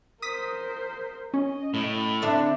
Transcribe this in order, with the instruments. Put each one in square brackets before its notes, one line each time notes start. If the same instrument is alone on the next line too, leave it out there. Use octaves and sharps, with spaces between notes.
[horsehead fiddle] A#4 C5 [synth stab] D#6 B6
[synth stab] C#4 [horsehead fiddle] D#5
[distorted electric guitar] A2
[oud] D3 D4 E5 [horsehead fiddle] C4 E4